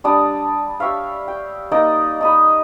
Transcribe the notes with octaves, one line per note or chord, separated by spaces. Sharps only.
G3 D4 D#6
G4 C#5 E5 F5
G5
A#3 D#4 D5 D#5
D#4 D#5 B5